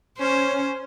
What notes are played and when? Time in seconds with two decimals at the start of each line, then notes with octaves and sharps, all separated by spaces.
0.19 C#4 C5